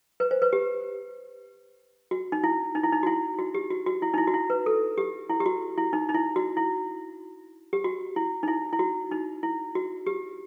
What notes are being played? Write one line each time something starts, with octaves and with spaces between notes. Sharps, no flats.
B4
C5
B4
G4
F#4
D#4
E4
D#4
E4
D#4
F#4
E4
F#4
G4
F#4
F#4
E4
D#4
E4
F#4
E4
B4
A4
G4
E4
G4
F#4
E4
D#4
D#4
E4
F#4
E4
G4
F#4
E4
D#4
E4
E4
F#4
D#4
E4
F#4
G4